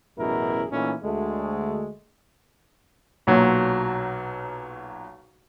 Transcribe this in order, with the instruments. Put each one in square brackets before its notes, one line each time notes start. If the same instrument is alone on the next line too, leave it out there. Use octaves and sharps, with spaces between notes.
[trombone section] A1 F#2 B2 E4 G#4 A#4
A#2 E3 A3 C#4 D#4 E4
D2 G#3 A3
[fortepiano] B1 A#2 F#3